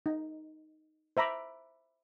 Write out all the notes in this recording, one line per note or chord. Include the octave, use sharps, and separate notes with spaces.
D#4
C5 E5 A#5 B5 D6